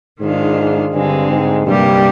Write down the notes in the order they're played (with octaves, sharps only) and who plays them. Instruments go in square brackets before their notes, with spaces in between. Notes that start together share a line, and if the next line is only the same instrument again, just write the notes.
[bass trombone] G#2 [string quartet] D#3 G#3 D4 F4
[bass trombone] G2 [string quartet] D3 G#3 C4
[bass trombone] G#2
[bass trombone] G2 [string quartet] C3 G3 A#3 D4 G4